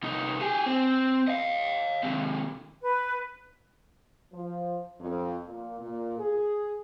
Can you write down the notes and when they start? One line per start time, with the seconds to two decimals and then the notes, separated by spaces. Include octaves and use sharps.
0.03 C2 D#4
0.41 G4 G#4
0.66 C4
1.28 D#5 F5
2.03 D#2 C3
2.82 B4
4.32 F3
5.00 F2
5.47 A#2
5.81 A#2
6.18 G#4